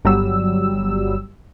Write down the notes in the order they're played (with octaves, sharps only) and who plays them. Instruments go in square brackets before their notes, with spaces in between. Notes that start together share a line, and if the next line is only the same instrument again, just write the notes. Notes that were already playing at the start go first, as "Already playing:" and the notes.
[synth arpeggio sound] G1 F#3 G3 E6